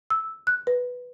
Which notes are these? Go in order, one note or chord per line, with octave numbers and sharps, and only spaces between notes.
E6
F#6
B4